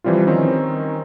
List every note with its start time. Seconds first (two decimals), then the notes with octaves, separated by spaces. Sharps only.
0.04 E3 F3 G3 C4 F4
0.26 D#3 C4 C#4 D#4